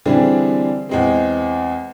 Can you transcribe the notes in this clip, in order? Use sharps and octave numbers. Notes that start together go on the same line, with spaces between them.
D3 E3 G3 C4 D4 G#4
E2 G#3 C4